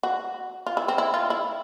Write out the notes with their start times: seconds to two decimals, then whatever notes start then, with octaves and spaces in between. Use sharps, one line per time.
0.03 F#4
0.66 F4
0.77 E4
0.88 C4
0.98 E4
1.14 F4
1.30 E4